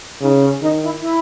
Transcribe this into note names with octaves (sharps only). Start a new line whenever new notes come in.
C#3 D#4
C#4
D#3 D#4
E4
E4